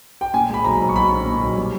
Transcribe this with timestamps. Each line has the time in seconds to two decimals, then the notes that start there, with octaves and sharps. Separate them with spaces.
0.21 G5
0.34 A#2 G#5
0.49 G#3 B5
0.64 B1 A#5
0.80 B1
0.89 C#6
0.95 B1 B5
1.11 A#2
1.26 A#2
1.41 B1
1.57 G3